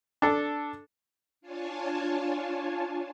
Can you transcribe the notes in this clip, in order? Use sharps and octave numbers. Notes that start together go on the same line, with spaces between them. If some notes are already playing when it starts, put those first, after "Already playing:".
D4 A4
D4 F4 C#5 G#5 A5